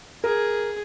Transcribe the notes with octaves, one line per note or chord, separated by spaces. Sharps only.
G#4 A#4